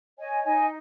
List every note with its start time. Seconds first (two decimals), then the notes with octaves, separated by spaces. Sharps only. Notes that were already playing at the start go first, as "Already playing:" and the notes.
0.18 C#5 D#5 G#5
0.44 D#4 D#5 G#5